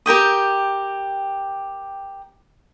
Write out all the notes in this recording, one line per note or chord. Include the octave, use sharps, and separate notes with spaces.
G4 A#4 G5 D#6